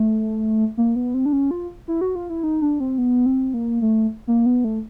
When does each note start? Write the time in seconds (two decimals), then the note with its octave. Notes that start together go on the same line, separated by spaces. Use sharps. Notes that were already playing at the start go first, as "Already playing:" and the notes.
Already playing: A3
0.77 A#3
0.96 B3
1.14 C4
1.26 D4
1.33 C#4
1.51 F4
1.88 E4
2.01 F#4
2.15 F4
2.30 E4
2.43 D#4
2.62 D4
2.80 C4
2.98 B3
3.26 C4
3.54 A#3
3.82 A3
4.27 A#3
4.46 B3
4.64 A3